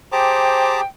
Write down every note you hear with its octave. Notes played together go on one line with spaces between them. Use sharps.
G4 G#4 C5 G5 A5 A#5 D6